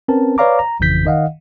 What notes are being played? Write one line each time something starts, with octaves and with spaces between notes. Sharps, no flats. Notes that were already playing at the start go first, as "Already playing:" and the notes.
C4 C#4 A#4 B4 A5
B4 C#5 D5 F5 A#5 D6
A#5
G#1 F2 C#3 E3 G6 B6
D#3 D#5 F5 F#5